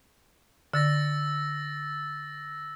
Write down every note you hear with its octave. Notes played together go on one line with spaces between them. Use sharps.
D3 E6 A6 A#6